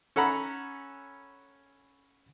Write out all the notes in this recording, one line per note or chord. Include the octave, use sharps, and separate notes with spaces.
C#4 A4 F#5 A#5 B5